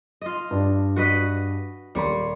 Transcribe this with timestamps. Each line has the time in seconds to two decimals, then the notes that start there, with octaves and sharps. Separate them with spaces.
0.21 F4 D#5
0.51 G2 D4
0.96 F#4 B4 D#5
1.95 D#1 G3 A#3 C#5 C6